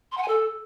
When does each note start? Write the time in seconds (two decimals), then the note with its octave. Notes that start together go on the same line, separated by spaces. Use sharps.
0.12 C6
0.17 F#5
0.23 G#5
0.28 A4